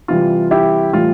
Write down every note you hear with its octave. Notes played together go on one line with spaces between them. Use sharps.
C3 E3 G3 F4
E4 G4
A2 E3 G3 F4